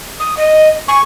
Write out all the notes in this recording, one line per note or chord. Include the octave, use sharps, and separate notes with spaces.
D#6
D#5
G#5 C#6